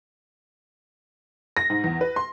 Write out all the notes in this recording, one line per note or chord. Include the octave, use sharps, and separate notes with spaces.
A#6
G#2
E2
B4
C6